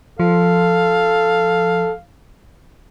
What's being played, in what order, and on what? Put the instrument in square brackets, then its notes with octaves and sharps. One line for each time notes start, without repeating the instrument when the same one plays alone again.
[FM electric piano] F3 [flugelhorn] A4 [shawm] F5